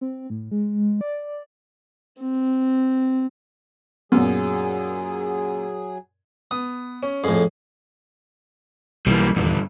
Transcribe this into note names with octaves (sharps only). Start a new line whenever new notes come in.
C4
A2
G#3
D5
C4
F#2 A#2 F#3 B3 G#4
B3 D#6
C#4
F2 A2 G#4
B1 E3 G3 A#3
D#1 E2 G2 D3